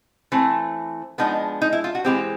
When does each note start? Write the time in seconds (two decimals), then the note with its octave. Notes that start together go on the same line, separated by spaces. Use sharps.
0.32 E3 A3 C4
1.18 F3 G#3 B3 D4 D#4
1.62 D#4
1.73 E4
1.84 F4
1.95 F#4
2.05 E3 G#3 C4 G4